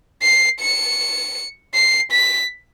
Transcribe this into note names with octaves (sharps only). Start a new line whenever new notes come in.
C7
C#7
C7
B6